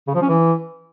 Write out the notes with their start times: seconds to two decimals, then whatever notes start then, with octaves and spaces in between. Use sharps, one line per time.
0.08 C#3
0.15 F3
0.22 C#4
0.29 E3